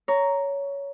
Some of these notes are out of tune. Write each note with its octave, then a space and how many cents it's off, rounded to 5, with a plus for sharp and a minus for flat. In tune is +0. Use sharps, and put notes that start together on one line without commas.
C#5 +15 A#5 +0